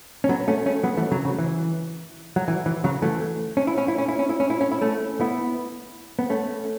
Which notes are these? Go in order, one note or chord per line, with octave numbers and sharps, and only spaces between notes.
C#4
F#3 B3
A3 C#4
A3 C#4
F#3 B3
E3 A3
C#3 F#3
C#3
E3
F#3
E3
E3
C#3 F#3
E3 A3
C#4
E4
C#4
E4
C#4
E4
C#4
E4
C#4
E4
C#4
E4
A3 C#4
B3 E4
B3
A3 C#4